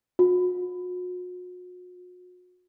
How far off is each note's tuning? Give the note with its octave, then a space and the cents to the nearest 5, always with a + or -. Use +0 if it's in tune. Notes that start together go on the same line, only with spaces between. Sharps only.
F#4 -40